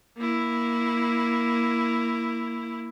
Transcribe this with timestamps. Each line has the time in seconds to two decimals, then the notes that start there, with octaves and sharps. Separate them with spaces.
0.17 A#3 E4